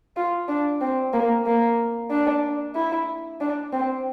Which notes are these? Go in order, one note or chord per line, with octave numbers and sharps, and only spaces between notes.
F4
D4
C4
A#3
A#3
D4
E4
D4
C4